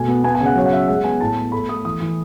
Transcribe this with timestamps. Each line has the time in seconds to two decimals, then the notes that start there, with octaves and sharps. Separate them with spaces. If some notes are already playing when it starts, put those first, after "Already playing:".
Already playing: B2 A3 G#5
0.08 B3
0.24 B3 G#5
0.35 G#5
0.40 C#3
0.46 F#5
0.56 F#3 C#5
0.66 F#5
0.72 C#4 E5
0.88 G#3 F#5
1.04 B3 G#5
1.21 A2 A5
1.36 B3
1.52 A3 B5
1.69 A3 D#6
1.85 E3 D#6
2.00 E3